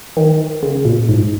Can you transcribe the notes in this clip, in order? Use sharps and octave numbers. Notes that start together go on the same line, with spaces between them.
D#3
C#3
A#2
G#2